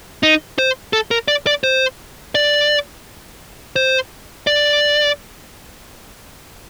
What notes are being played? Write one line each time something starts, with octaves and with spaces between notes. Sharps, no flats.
D#4
C5
A4
A#4
D5
D5
C5
D5
C5
D5